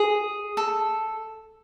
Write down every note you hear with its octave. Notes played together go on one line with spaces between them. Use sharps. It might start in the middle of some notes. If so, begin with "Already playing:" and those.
Already playing: G#4
A4